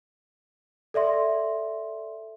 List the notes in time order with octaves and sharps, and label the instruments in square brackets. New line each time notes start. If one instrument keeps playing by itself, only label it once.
[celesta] A4 D5 E5 C6